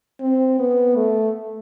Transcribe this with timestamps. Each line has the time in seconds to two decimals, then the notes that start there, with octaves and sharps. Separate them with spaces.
0.21 C4
0.59 B3
0.96 A3